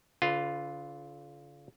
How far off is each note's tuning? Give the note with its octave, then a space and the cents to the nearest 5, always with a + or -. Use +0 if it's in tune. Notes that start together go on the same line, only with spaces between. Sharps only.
D3 -40 F4 +0 B4 +15